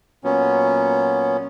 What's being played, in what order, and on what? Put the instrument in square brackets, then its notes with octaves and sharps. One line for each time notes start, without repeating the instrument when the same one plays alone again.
[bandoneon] A#2 F#3 B3 C#4